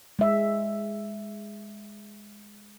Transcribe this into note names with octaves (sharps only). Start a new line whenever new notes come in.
G#3 E5